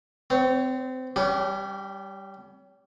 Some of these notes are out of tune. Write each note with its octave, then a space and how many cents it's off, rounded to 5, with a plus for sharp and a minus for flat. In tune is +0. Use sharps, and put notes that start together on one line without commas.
C4 -25 C#5 +10
G3 +0 C#4 +40 G4 -40